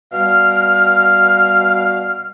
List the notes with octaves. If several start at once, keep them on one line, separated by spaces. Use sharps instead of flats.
B2 G3 F5 F6